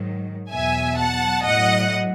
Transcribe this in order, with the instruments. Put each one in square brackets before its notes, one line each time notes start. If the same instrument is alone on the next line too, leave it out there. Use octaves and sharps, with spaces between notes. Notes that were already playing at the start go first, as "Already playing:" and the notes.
Already playing: [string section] G#2 D#3 F#3
E2 B2 F#3 E5 G#5
F#5 A5
A2 F#3 D#5 F#5